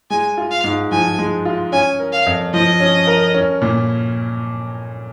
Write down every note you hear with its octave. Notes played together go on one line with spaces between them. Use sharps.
G#3 G#5
F4
F5
G#2
F3 G#5
G#3
F4
C#4 G#5
A#4
F5
F2
F3 D#5
C#4
A#4
C#4
A#2